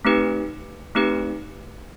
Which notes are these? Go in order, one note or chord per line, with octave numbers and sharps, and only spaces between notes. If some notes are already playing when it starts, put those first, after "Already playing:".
A3 C4 D#4 G4 B4
A3 C4 D#4 G4 B4